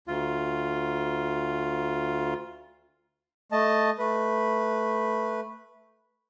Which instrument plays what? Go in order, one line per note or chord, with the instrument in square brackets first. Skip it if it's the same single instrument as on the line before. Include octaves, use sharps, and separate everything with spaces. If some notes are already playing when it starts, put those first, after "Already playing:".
[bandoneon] D2 F4
[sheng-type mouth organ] A3 D#5 A5
A3 B4